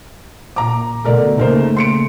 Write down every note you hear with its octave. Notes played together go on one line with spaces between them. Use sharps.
A#2 A#5 D6
B2 D3 A3 A#4 D5
C#3 A3 A#3 D#4 A#4 C5
C6 C#7 D7